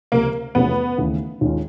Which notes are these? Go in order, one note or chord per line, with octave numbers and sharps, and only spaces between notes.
C#2 C3 F3 A#3
E2 C3 F3 A3 B3 C#4
D#2 C#3 E3 A3
D#2 D#3 G#3 C#4 F4